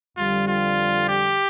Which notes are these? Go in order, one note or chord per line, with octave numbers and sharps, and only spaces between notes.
F2 D3 G3 F4
F4
G4